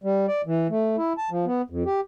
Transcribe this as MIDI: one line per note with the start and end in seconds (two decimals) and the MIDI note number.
0.04 0.26 55
0.28 0.42 74
0.46 0.67 52
0.69 0.96 57
0.97 1.13 64
1.18 1.29 81
1.31 1.45 53
1.46 1.62 59
1.70 1.84 41
1.86 2.00 67